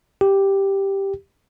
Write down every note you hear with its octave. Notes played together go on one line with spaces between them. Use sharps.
G4